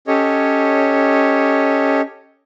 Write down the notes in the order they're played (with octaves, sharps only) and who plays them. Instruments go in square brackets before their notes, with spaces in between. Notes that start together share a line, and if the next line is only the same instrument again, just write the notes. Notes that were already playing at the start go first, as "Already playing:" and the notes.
[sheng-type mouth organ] C#4 G4 A4 C#5 D#5